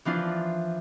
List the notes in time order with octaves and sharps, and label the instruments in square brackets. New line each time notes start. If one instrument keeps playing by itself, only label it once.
[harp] E3 F3 D4 F4